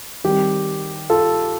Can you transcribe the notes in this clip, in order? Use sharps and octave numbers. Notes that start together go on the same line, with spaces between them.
D#3 G3 C4 G4
F4 A4